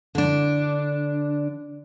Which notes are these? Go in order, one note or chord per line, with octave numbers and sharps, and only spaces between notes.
D3 D4